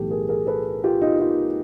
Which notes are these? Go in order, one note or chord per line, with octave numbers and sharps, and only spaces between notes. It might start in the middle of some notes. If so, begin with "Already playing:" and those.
Already playing: B1 A2 E3 G4 A4
G#4 A#4
G#4 A#4
A4 B4
F4 G4
D#4 F4
D#4 F4